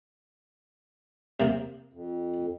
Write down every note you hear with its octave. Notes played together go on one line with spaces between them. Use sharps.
C3 A#3
F2